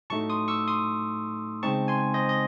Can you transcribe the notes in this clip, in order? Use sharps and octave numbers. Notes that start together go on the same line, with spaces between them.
A2 F#3 A3 D#4 A5 C#6
C6 D#6
C#6 E6
C6 D#6
C#3 G#3 C4 D#4 A5 C#6
G#5 C6
C5 D#5
D#5